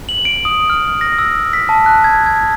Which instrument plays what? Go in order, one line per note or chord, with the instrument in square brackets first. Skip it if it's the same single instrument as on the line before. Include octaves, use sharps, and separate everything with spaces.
[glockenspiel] F#7
D7
D#6
F6
A#6
E6
B6
A5
F#6
G#6
G#6